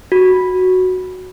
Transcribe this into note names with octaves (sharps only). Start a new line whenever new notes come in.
F#4